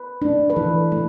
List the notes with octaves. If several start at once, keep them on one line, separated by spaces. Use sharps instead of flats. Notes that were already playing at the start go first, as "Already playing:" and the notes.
Already playing: B4
A3 D4
B4
E3 A4
A3